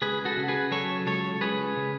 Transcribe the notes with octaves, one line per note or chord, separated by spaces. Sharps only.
C#2 G#4 B4
F#4 A4
C#3
G#4 B4
F#3 A4 C#5
C#2 A4 C#5
C#2 G#4 B4
C#3